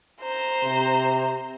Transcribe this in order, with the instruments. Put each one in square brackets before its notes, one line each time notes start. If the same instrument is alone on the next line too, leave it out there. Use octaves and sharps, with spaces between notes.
[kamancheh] C5 A#5
[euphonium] C3